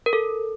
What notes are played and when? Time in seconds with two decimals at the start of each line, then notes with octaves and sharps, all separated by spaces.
0.06 A#4
0.13 A4